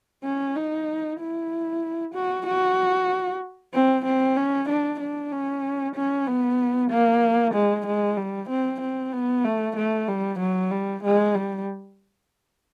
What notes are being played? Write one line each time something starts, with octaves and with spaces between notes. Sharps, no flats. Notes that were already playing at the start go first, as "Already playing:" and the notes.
C#4
D#4
E4
F#4
F#4
C4
C4
C#4
D4
D4
C#4
C#4
B3
A#3
G#3
G#3
G3
C4
C4
B3
A3
A3
G3
F#3
G3
G#3
G3